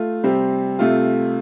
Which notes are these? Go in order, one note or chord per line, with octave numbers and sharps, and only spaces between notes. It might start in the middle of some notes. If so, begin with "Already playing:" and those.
Already playing: A3 F4
C3 G3 C4
C3 A3 F4